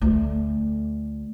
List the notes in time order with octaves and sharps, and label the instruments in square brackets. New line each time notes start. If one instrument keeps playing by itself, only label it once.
[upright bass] D2 A3